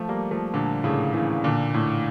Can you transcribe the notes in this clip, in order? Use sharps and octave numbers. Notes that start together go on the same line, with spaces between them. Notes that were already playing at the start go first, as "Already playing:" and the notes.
Already playing: F3 A3
G3 A#3
F3 A3
A#2 D3
A2 C#3
C#3 E3
A#2 D3
A2